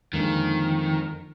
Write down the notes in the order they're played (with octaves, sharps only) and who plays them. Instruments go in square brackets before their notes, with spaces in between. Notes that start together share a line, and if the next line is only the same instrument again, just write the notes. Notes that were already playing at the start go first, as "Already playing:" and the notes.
[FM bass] F2 [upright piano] D3 G#3 A#3 [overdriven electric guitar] D#3